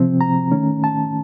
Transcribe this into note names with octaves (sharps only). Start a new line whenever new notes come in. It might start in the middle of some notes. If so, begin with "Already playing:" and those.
Already playing: C3 F3 C4
A#5
D#3 A3 C#4
A5